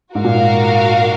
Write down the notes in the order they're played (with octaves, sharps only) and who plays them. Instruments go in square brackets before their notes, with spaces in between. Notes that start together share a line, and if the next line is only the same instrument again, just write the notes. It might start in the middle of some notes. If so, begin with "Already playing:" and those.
[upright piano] G#2 [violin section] F#4 A#4 F5
[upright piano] A#2
G#2